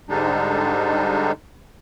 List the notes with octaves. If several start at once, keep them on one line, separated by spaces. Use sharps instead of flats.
G#2 D3 G3 G#3 D4 D#4